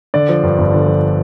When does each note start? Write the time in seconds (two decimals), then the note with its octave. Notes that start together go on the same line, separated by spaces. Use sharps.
0.14 D3 D5
0.29 F3
0.43 G2
0.58 G1
0.73 D3
0.87 F3